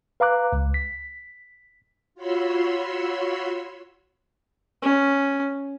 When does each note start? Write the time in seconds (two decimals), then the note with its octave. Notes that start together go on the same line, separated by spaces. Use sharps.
0.20 B4 F5 A#5 D6 F#6
0.53 C#2
0.74 B6
2.15 F4 F#4 C#5 B5 C6 E6
4.83 C#4